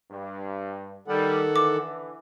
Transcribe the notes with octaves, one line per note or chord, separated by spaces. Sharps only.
G2
D#3 G3 A4 F#5
D3 E3 D6